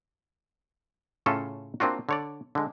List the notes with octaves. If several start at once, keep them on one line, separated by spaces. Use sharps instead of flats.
A2 C#3 C#4 F4 A4
A#3 C4 D4 F4 F#4
D3 C#5 D5
D3 G#3